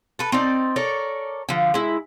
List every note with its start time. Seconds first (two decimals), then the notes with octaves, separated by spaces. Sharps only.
0.19 A4 B4
0.32 C4 D#4 D5
0.76 A4 A#4 C#5 D5
1.49 D3 F3
1.74 G#3 E4